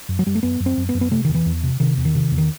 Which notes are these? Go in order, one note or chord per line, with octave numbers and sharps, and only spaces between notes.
F#2
F#3
F#2 G3
A3
F#2 B3
F#2
C4
F#2
B3
F#2
B3
C3 A3
E2 D#3
E3
E2
C3
C3 D#3
E2
D#3
C3
E2
D#3